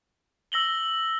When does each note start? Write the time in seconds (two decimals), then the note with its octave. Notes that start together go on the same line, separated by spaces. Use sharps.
0.52 E6 A#6 F#7 G7